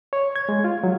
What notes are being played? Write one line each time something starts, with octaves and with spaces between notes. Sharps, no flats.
C#5
G#6
G#3
F4
F#3